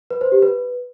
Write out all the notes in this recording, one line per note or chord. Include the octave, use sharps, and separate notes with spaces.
B4
C5
G4
B4